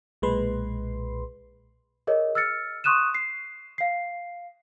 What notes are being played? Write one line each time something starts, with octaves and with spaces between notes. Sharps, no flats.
B1 A#2 G#3 B4 C6
G#4 A#4 C#5 D#5
E6 F6 A6 C#7
C6 C#6 D#6 F#6 D#7 E7
C7
F5 C7